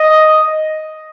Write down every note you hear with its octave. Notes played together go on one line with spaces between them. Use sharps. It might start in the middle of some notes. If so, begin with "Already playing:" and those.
Already playing: D#5